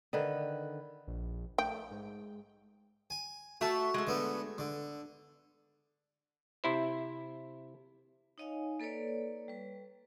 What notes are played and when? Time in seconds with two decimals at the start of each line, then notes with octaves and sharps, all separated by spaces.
0.13 D3 D#3 B4
1.07 A#1
1.58 A3 G5
1.91 G#2
3.10 G#5
3.61 A3 F#4 E5 A5
3.94 G#3 A3
4.07 D3 B3
4.58 D3
6.64 C3 E4 C5
8.38 D#4 C#5 D#5 F5 G#5
8.80 A#3 A4 B4 C#5 D5
9.48 G3 B4